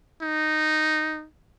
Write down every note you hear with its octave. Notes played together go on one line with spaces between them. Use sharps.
D#4